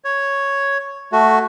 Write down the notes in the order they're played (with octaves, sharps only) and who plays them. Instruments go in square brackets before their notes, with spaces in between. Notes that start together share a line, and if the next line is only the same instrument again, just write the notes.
[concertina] C#5
A3 F#4